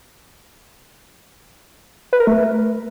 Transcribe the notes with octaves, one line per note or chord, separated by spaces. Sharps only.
B4
A#4
A3